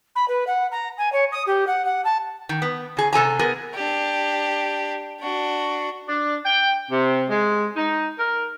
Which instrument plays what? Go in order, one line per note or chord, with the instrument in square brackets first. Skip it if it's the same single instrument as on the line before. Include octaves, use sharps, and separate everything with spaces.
[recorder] B5
B4
F#5
A#5
G#5
C#5
D#6
G4
F#5
F#5
A5
[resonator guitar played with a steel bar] D#3
B3
C#3 G#4
C3 A4 G#5 A#5
B3 G#4 A#4
[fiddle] D4 G4
D4 F#4
[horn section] D4
G5
C3
G#3
D#4
A#4